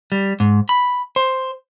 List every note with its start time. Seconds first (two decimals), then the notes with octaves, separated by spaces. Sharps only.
0.12 G3
0.40 G#2
0.69 B5
1.16 C5